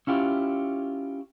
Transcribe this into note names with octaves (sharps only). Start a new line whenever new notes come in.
C#4 E4 F4 G4